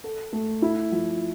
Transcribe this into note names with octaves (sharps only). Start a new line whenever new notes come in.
A4
A3
E4
F3